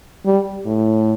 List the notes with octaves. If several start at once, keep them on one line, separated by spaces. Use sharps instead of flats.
G3
A2